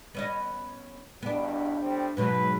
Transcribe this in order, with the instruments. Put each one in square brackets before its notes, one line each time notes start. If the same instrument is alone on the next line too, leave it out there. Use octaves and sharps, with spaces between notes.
[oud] B3 C#4 D#5
[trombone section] B1 E2 G2 [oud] B3 D4
[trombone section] A2 G3 C4
[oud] G#2 B2 F#3 [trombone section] B4